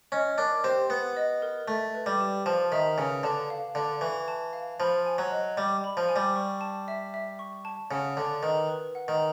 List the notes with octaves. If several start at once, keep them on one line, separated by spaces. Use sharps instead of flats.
C#4 D#5
D4 A#4
C4 G4
B3 F#5
D#5
A#4
A3 E5
B4
G3
G4
F3 A5
D#3 E5
C#3 B4
D3 A5
F5
D3 D5
E3 C#6
A5
F5
F3 B5
G#5
F#3
D#5
G3 D6
B5
F3
G#5
G3
C#6
A5
E5
E5
C#6
A5
C#3 F#5
D3 D5
D#3 B4
B4
F#5
D#3